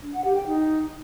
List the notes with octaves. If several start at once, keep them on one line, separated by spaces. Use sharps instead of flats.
D4
F#5
G4
G5
D#4